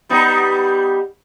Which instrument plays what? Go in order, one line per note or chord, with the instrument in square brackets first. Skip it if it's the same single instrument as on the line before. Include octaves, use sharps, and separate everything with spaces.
[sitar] G3 B3 D#4